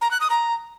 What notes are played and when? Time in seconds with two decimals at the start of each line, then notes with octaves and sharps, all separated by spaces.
0.01 A#5
0.11 F#6
0.21 D#6
0.30 A#5